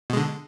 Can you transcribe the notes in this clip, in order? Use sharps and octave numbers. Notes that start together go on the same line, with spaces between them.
B2 D3 G#3